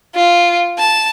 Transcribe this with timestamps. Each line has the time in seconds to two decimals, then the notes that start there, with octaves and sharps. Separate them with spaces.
0.15 F4
0.78 A5